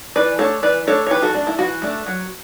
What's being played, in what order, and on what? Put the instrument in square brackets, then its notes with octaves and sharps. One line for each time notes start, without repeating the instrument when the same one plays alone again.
[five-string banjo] E3 B4 D5
A3 D4 A4 C#5
E3 B4 D5
A3 D4 A4 C#5
C#5
E3 G4 B4
F#4 A4
A3 D4
E4
E3 F#4
A3 D4
F#3